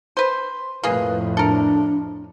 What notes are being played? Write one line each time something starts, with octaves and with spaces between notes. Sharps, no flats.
B4 C5
F2 A2 A#3 G#4 B4
D4 A4 A#4